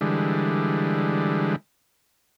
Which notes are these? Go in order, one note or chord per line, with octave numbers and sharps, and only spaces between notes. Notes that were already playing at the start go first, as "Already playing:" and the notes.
D3 E3 G3 G#3